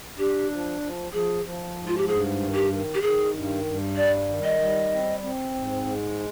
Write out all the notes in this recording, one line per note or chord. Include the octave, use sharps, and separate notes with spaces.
D4 G4
F3
F3
F3 G#4
F3
G#2
F4
G4
G2 G#4
D#3
G4
D#3
G4
D#3 G#4
G2
G2
G3 D5
D#3
D#5
G3
C4
C4
G#2
G#3